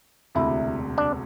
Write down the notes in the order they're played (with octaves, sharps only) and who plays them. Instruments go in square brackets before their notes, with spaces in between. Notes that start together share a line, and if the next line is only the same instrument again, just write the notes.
[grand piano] E1 D2 C3 [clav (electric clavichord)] E4
[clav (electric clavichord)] D4